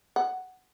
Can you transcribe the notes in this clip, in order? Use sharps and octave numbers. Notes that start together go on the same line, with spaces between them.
F#5